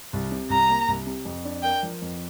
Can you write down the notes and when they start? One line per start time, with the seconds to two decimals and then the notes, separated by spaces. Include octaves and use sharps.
0.13 C2
0.32 C3
0.50 C2 A#5
0.69 A#3
0.88 C2
1.07 C3
1.25 F2
1.45 D4
1.63 A#4 G5
1.83 F3
2.01 F2